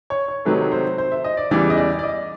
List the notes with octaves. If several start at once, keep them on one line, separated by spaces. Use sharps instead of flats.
C#5
C#5
C3 D#3 F#3 A3 B4
C5
C5
E5
D#5
D5
E2 C#3 E3 G3 D5
D#5
D5
D5
D#5